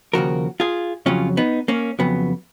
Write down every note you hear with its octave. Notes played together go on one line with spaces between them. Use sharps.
D#2 C#3 F3 F#4 A#4
F4 G#4
F2 C#3 F#3 C#4 F4
B3 D#4
A#3 C#4
F2 C#3 F#3 B3